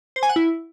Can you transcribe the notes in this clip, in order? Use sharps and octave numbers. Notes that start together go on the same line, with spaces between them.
C5
G#5
F#5
E4